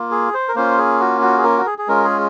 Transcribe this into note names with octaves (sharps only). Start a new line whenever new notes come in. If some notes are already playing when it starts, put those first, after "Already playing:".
Already playing: A#3 F4
G#4
C5
A#4
A#3 C#4 F4 C5
G#4
F#4
F#4
G#4
A#4
F#4
G#4
G#4
G#3 C#4 F4 A#4
G#4